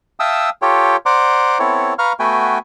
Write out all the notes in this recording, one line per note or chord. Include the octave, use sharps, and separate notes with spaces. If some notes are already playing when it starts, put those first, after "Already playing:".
E5 F5 G5 A5 D#6 E6
F4 G4 A4 C#5 G5
C5 D5 F#5 A#5 C6 D6
B3 C4 E4 A4 C#5
B4 F5 A#5 C#6 F6
A3 B3 F#4 B4 G5 G#5